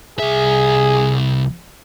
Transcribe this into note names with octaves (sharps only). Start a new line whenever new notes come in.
C2 G#4 E5